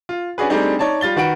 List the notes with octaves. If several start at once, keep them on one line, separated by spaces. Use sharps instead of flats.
F4
C#4 D4 F#4 G#4 B4
G3 A3 C4 D4 D#4 G#4
D#4 C#5 D5 A5
G3 F4 A6 G7
D#3 F#4 B4 F#5 D7